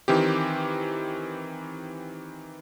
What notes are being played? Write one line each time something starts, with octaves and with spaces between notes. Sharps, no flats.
D#3 E3 C4 G4